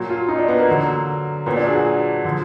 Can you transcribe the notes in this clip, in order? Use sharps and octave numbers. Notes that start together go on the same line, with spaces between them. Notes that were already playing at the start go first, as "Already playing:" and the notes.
Already playing: A#2 F#3
F4
D#4
D4
B3
A#3
D3 F#3
A#2 F#3 B3
D4
G#4
F#4
D3 F3